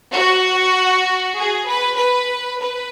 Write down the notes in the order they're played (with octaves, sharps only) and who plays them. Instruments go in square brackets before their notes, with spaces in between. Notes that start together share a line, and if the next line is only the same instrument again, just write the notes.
[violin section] F#4
G#4
B4
B4
B4